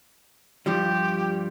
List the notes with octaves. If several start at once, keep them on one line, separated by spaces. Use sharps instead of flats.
G2 F3 G3 G4